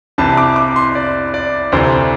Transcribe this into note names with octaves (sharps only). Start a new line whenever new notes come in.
C2 C3 E3 A5
D6
D6
C6
D5
D5
D2 C3 E3 C5